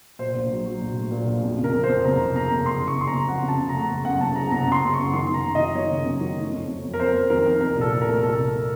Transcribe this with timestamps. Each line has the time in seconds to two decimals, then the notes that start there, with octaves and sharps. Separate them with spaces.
0.19 A#2 C5
0.34 A#1
0.51 F#3
0.66 F#3
0.81 A#1
0.96 A3
1.11 A#2
1.27 A#1
1.43 F2
1.58 C#3
1.64 A#4
1.74 F2
1.84 C5
1.89 F2
2.05 F#1 A#5
2.20 F#1
2.36 F#1 A#5
2.51 F#1
2.66 F#1 C6
2.81 C#3
2.87 C#6
2.97 F#1 C6
3.07 A#5
3.13 F#1
3.28 F2 F#5
3.43 C#3
3.48 A5
3.59 C#3
3.69 A#5
3.75 A3
3.90 F#1
4.05 F#2 F#5
4.21 F#1 A5
4.36 F#1 A#5
4.51 F#1 A#5
4.63 A#5
4.67 C#3 C6
4.82 F#1
4.94 F#2 C#6
5.14 D#3 C6
5.29 D#3 A#5
5.44 F#1
5.55 D#3 D#5
5.75 D#3 C#5
5.91 F#1
6.06 F#2
6.21 D#3
6.37 A3
6.52 F2
6.68 F2
6.84 F2
6.94 A#4
6.99 F2 C5
7.14 F2
7.30 D#3 A#4
7.46 F2
7.61 C2 A#4
7.76 A#2
7.81 A4
7.92 C2
8.01 A#4
8.08 A3
8.23 C2 A4
8.38 C2